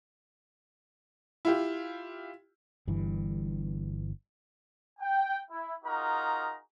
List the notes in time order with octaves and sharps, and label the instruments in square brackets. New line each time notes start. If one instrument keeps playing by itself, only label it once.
[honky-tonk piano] E4 F4 G4
[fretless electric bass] G1 G2 E3
[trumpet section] G5
E4
D#4 F4 F#4 G#4 A#4 A#5